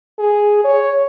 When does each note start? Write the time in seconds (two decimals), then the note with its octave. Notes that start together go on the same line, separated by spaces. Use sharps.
0.19 G#4
0.65 C#5